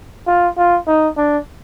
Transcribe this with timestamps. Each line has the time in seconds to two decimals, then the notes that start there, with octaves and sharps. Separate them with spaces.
0.27 F4
0.58 F4
0.87 D#4
1.17 D4